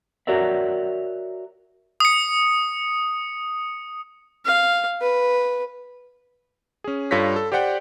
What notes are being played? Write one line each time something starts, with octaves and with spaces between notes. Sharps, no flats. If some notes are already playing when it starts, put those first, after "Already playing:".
F#4 A#4 C#5 D5 E5
D#6 C#7
F5
B4
C#4 G#4
G2 F4 A4 C#5 A#6 B6
A4
G4 C5 D5 F#5 G5